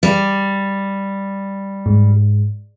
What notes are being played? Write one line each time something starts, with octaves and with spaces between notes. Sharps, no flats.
G3
G#2